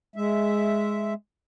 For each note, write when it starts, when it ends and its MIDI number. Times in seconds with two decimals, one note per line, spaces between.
0.16 1.14 56
0.16 1.14 76